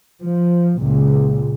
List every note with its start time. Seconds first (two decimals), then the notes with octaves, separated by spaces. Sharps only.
0.22 F3
0.78 C#2 A#2